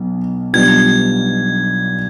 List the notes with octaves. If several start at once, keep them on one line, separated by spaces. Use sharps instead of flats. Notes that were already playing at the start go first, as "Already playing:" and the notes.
Already playing: B1 B2
B1 B2 G3 D4 F4 G#6